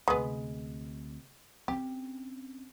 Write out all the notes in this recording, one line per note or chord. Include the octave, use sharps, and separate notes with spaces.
D2 C3 G#3 B3
C4 C#4 G4